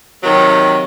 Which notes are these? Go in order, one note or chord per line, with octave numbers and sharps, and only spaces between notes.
C3 D#3 F#3